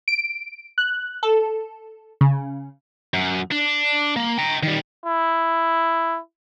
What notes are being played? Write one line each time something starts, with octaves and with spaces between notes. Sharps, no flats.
D7
F#6
A4
C#3
F#2
D4
A#3
G5 A#5
D#3 G3
E4